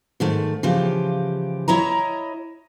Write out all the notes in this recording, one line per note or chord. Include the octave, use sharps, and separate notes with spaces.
G#2 D#3 A3
C#3 E3 F3 G4
E4 C#5 D#5 A#5